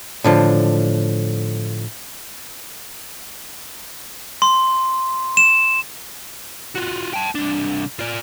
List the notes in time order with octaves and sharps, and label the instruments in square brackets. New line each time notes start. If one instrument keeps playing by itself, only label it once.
[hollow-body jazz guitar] A2 D3 F3
[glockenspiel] C6
E7
[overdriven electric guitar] F4 F#4
G5 A5
C2 D4
F4 D5